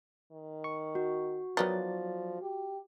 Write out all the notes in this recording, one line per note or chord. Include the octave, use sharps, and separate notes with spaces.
D#3
C#6
F#4
D#3 F3 F#3 B3 D#4 D5 A6
G4